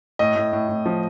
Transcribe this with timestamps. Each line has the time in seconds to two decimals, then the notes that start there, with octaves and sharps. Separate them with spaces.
0.19 A2 D#5
0.36 A2
0.53 A2
0.69 A2
0.86 F3